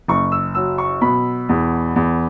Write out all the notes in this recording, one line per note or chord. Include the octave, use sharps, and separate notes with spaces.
F#1 C#6
E6
F#3 E6
C#6
B2 B5
E2
E2